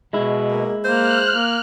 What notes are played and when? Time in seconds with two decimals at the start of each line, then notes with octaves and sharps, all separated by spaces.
0.13 B2 G#3 E4
0.51 A#3
0.85 A#3 C5 F6 F#6
1.32 A#3